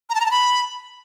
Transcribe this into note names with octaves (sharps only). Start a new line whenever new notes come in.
A#5
A5
A#5
A5
B5